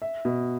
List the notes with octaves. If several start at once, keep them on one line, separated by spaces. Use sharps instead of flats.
E5
B2